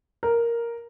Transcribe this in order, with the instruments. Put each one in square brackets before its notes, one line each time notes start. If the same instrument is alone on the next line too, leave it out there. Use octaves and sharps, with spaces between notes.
[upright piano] A#4